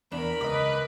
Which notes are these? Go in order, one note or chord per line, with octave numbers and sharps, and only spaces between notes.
E2 D4 A#4 B5
C#2 B4 D#5 D6